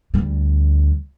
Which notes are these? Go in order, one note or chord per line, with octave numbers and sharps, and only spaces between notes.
D2 G3